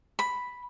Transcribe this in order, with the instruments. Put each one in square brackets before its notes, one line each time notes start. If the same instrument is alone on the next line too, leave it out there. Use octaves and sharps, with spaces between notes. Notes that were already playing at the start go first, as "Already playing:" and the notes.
[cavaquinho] B5